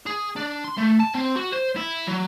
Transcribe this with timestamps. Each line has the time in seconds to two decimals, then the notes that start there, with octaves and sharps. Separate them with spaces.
0.07 G#4
0.36 D4
0.65 C6
0.78 A3
1.00 A5
1.15 C4
1.36 F#4
1.52 C5
1.76 E4
2.07 F#3